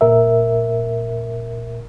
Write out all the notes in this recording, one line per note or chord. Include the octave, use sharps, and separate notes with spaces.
A#2 A#4 E5